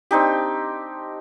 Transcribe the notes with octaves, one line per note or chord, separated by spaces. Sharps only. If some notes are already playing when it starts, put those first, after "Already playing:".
C4 D4 D#4 G4